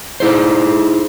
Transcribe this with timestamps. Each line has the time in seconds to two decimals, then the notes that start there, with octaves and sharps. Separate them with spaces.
0.20 D#4 E4 G#4 C5